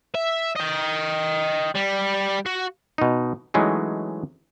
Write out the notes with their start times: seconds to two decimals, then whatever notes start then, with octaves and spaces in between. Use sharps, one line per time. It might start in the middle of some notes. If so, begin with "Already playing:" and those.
0.15 E5
0.56 D#5 G5
1.75 G3
2.46 F#4
2.98 B2 D#4
3.54 E3 F#3 G#3 A3 C#4 D#4